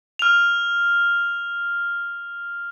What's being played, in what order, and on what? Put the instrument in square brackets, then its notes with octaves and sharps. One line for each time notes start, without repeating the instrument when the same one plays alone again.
[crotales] F6 F7